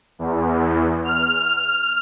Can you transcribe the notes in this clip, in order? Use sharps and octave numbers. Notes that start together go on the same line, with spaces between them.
E2
F6